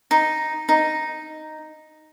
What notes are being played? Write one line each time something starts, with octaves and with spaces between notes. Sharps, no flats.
D#4
D#4